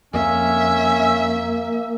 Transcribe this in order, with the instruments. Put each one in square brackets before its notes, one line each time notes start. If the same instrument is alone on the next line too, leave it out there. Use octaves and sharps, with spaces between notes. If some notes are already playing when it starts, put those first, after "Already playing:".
[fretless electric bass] F2 [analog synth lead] A#3 [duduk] C#4 [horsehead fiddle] E5